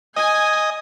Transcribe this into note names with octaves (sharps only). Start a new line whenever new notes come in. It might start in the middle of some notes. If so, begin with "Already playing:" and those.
D#5 G#5